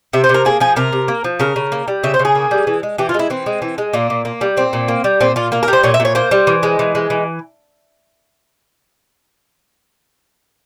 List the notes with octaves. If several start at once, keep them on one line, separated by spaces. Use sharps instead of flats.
C3 E5
C5
C3
A#4
A#3 G#4
F3 G#4
C3 A#4
C3
A#3
F3
C#3 A#4
C#3
A#3
G3
C#3 E5
C5
C#3
G#4
A#3
G3
E3
G#3
E3 G4
F4
G#3
E4
E3 C4
G#3
E3
G#3
A#2 A#3
A#2
A#3
G3
A#2 C4
A#2
A#3
G3
A#2 C4
A#2 F4
A#3 A#4
A#4
G3
C5
A#2 C#5
E5
A#2
C#5
A#3 C5
G3
E3
G#3
E3
G#3
E3